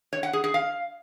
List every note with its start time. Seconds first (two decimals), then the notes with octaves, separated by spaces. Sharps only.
0.13 C#5
0.23 F#5
0.33 G#4
0.44 G#4
0.54 F5